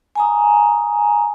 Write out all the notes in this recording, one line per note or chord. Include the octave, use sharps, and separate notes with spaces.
G#5 A#5 D#6